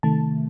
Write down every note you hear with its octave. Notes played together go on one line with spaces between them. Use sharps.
C3 D#3 A3 A5